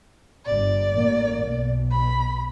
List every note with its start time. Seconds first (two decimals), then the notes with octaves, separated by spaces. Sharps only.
0.46 G1 D5
0.90 A1 A#3
1.44 B1 B2
1.91 B5